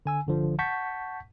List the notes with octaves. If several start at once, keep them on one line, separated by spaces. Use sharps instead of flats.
D3 G#5 E6
G1 D3 F3
F#5 A5 C#6 G6 B6